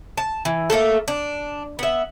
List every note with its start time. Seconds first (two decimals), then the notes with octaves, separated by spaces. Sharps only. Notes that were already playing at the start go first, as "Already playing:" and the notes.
0.17 A5
0.45 E3
0.70 A3 A#3 G4 A4
1.08 D4
1.79 B3 E5